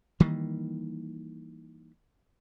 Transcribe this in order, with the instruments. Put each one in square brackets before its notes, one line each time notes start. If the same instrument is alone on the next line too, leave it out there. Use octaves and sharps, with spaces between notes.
[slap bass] D#3 E3 G3 A#3